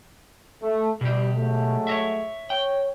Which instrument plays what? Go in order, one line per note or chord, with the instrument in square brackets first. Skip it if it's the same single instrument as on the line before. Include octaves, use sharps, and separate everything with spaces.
[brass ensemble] A3
[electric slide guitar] B2 G4 [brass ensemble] G3
[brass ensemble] F#3 G#3 A3
[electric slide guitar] C#5 D#5 E5
[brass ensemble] C#5 [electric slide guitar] G5